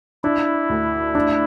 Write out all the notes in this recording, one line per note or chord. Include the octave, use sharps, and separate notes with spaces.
D4 E4
D2
D4